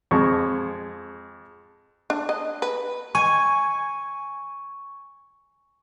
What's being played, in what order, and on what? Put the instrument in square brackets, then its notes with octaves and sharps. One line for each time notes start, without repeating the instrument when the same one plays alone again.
[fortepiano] F2 G#3 C#6
[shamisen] D4
D#5
B4
[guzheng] G#5 [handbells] C#6